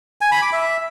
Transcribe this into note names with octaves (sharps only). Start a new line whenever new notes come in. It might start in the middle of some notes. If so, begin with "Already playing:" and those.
G#5
B5
D6
E5